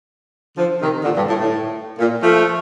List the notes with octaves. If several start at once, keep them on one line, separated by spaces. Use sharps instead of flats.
D3 F3
C3 D#3
A#2 D3
G2
A2
A2
A#2
F3 A3